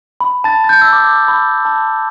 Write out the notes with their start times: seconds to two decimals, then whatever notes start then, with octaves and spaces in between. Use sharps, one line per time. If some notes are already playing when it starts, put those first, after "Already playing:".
0.20 B5
0.44 A5 A6
0.64 A6
0.69 G6
0.81 E6
0.93 D6
1.28 B5
1.65 A5